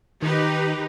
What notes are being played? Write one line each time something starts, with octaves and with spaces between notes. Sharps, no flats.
D#3 D#4 G4 B4